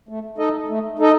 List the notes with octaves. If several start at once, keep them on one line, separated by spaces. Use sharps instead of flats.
A3
D#4 A4 D#5
A3
D#4 A4 D#5